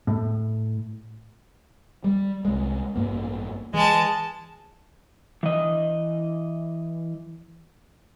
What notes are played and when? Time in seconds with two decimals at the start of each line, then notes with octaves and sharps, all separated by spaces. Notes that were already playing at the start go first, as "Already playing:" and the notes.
0.07 A2
2.04 G3
2.45 C2 G#3
2.96 A1 G2 A#3
3.74 E3 G#3 A5
5.43 E3 D#5